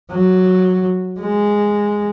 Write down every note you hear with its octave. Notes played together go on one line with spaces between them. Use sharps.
F#3
G#3